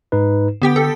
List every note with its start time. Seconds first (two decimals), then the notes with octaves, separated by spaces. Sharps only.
0.12 G#2 D#4 B4
0.62 D3 B3 G4 G5
0.76 A4